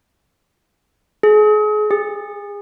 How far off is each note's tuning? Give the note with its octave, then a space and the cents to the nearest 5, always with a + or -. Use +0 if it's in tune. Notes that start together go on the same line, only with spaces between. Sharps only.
G#4 +35
G#4 -30